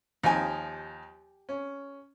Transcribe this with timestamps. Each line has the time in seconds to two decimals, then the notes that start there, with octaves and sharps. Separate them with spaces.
0.23 D#2 F3 D#4 G4 G#5
1.49 C#4